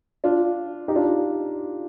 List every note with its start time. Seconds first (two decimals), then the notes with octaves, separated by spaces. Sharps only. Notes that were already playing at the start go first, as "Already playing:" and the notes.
0.24 D4 F4
0.88 D#4 G4
0.96 D4 F4